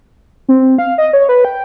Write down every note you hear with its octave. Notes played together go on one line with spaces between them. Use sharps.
C4
F5
D#5
C#5
B4
G5